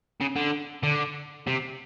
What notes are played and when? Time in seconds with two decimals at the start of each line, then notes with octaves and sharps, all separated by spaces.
0.21 C#3
0.36 D3
0.83 D3
1.47 C3